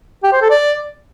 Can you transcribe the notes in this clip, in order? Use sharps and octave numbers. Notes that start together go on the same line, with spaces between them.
G4
C5
A4
D5